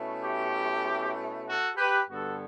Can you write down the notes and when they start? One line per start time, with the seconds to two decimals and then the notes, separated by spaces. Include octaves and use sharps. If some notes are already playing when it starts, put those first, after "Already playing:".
Already playing: B2 A3 C#4 E4
0.21 G4
1.46 F#4 A4
1.77 G4 B4
2.08 G2 D3 G3 B3 D4 F#4 A4